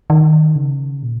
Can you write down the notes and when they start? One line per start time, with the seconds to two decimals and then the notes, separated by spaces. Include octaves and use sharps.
0.10 D#3
0.56 C#3
1.03 A#2